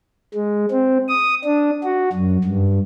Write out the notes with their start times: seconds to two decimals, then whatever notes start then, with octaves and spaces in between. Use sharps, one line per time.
0.34 G#3
0.71 C4
1.08 D#6
1.45 D4
1.84 F#4
2.13 F#2
2.44 G2